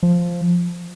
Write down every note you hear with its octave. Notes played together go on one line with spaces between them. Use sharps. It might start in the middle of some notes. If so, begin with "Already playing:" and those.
F3